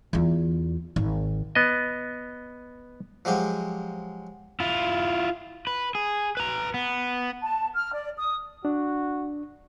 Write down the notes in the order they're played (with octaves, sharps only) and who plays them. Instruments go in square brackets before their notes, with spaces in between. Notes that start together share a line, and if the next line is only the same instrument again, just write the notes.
[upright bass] E2 F4
G#1
[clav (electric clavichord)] B3 D#5
[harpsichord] F3 F#3 G#3 G4
[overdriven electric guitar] E4 F4
B4
G#4
B4 A#5
B3
[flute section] A5
F6
D5
D#6
[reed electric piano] D4 [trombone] F#4